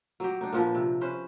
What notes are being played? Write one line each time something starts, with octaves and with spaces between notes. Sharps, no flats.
F#3 G4
D4 D#4
A#2 F3 B4
C3
C#4 B4 C5